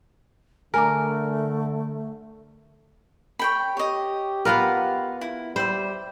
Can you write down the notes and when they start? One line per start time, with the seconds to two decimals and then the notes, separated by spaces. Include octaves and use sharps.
0.74 D3 A3 A#4 G#5 A#5 D6
3.39 C#5 G5 B5
3.77 G4 C#5 D#5
4.45 B3 F4 A#4 B4 F5 F#5
5.21 E4
5.56 G3 C5 E5 B5